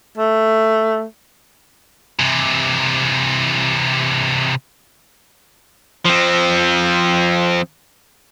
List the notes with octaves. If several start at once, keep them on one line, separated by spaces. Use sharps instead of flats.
A3
C3 E3
F3 C4